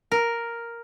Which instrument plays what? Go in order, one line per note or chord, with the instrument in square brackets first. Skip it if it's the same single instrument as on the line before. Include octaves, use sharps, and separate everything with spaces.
[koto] A#4